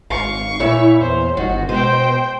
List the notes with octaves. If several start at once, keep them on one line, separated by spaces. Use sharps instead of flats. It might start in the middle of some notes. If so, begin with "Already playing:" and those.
G#1 F5 C#6
A#2 E4 C#5 E5
E2 C5
G1 D#3 F#4
B2 G#3 C5 G5